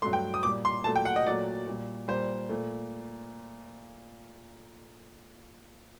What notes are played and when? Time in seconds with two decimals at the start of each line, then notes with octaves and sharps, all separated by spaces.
0.02 A3 C6
0.05 G2 F#3
0.13 G5
0.34 D#6
0.43 A#2 G3 D6
0.65 C6
0.84 A#2 F#3 A3 A5
0.96 G5
1.05 F#5
1.16 D#5
1.26 A#2 F#3 A3 D5
1.67 A#2 G3
2.08 A#2 G3 C5
2.49 A#2 A3